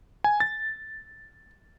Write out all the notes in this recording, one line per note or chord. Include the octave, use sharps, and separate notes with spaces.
G#5
A6